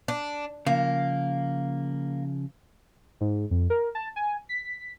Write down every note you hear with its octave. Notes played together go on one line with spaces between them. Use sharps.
D4
C#3 F3 A#3
G#2
F2
A#4
A5
G#5
B6